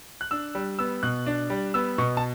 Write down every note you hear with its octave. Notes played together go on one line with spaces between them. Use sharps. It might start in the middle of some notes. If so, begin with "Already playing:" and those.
F#6
D4 E6
G3
B3 E6
B2 F#6
D4
G3
B3 E6
B2 C#6
A5